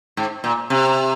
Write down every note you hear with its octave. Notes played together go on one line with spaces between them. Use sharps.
G#2
A#2
C3